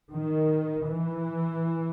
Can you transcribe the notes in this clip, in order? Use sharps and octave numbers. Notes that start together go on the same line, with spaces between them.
D#3
E3